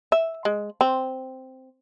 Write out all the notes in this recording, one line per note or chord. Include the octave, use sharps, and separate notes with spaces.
E5
G#3
C4